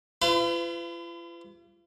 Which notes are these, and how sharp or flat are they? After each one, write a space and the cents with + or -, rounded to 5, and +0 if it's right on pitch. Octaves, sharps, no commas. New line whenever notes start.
F4 -40 B4 +40